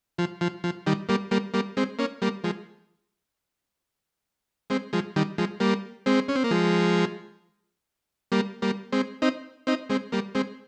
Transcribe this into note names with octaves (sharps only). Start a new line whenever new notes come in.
F3
F3
F3
D#3 G3
G3 A#3
G3 A#3
G3 A#3
G#3 C4
A#3 C#4
G3 A#3
F3 G#3
G#3 C4
F3 G#3
D#3 G3
F3 G#3
G3 A#3
G#3 C4
C#4
C4
A#3
F3 G#3
G3 A#3
G3 A#3
G#3 C4
C4 D#4
C4 D#4
G#3 C4
G3 A#3
G#3 C4